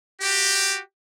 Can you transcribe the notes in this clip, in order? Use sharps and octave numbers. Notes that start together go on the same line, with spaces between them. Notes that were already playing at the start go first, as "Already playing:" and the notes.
F#4 G4